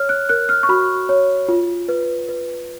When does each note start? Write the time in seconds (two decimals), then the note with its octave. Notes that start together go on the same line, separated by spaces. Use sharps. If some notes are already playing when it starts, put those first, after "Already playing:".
Already playing: C#5 F6
0.09 F#6
0.29 A#4 F#6
0.49 F6
0.63 C#6
0.69 F#4 B5
1.09 C#5
1.49 F4
1.88 B4
2.28 B4